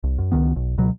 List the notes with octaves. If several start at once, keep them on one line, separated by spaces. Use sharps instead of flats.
C2
F#2
C#2 G2 D#3 B3
B1
C#2 B2 F#3